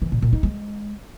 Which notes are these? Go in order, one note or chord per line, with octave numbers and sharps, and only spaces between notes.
E3
A#2
A#2
D#4
G#3